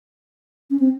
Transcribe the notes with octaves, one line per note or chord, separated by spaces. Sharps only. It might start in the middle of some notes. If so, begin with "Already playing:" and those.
C#4
C4